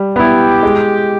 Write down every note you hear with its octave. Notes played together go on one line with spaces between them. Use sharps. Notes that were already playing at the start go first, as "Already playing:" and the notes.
Already playing: G3
B3 E4 G4
G#3